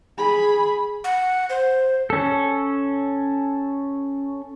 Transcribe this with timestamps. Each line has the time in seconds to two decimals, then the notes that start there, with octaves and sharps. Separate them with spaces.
0.18 G#4 B5
1.04 F#5
1.50 C5
2.10 C#4 A4